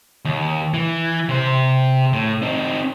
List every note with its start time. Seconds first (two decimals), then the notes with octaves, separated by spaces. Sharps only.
0.25 D#2
0.74 E3
1.29 C3 C5
2.13 A2
2.42 C4 D#4